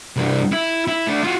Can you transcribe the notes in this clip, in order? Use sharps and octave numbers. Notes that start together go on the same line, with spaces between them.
C2 G2
E4
E4
A3 D4
F4 F#4